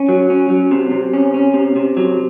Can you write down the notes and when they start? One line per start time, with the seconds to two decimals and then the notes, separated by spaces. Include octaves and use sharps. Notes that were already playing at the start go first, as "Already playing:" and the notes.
Already playing: C#4
0.09 F#3
0.30 C#4
0.50 F#3
0.71 C3
0.92 C3
1.13 C#4
1.34 C#4
1.54 C3
1.76 C3
1.97 F#3